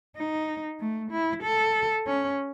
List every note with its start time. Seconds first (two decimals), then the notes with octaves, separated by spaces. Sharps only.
0.17 D#4
0.80 A3
1.11 E4
1.43 A4
2.07 C#4